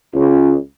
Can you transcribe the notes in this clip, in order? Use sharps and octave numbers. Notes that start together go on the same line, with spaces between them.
C#2